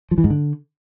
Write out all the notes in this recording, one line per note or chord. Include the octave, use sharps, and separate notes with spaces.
F3
E3
G#2
D3